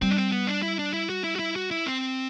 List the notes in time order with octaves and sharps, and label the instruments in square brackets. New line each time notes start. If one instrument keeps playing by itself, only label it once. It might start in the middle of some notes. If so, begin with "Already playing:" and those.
[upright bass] G3 [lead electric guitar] C4
[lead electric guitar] D4
C4
B3
D4
E4
D4
E4
F#4
E4
F#4
E4
F#4
E4
C4